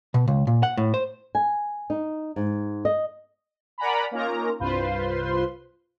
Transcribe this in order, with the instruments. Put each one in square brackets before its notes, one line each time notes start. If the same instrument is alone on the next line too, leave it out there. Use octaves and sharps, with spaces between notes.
[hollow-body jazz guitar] B2
C#2
A#2
F#5
A2
C5
[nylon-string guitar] G#5
D#4
G#2
D#5
[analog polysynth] A#4 D5 F#5 G#5 A#5 B5
A#3 C#4 D#4 F4 A#4 A#5
C2 G2 F4 B4 C5 C6